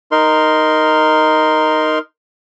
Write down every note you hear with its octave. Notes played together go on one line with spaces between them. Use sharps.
D#4 A#4 C6